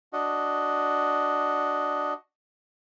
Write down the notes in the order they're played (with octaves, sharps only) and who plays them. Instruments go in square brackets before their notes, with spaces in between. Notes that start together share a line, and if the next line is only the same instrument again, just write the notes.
[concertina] D4 F#4 D#5